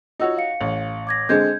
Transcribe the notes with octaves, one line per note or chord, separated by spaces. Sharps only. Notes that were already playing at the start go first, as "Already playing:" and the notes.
D#4 F4 F#4 C#5 E6
F5 C#7
A1
D6 G#6 A#6
D3 G#3 C4 G6 G#6